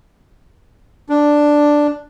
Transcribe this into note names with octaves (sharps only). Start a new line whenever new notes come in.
D4